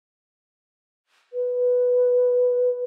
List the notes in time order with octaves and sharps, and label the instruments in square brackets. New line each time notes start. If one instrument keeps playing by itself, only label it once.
[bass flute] B4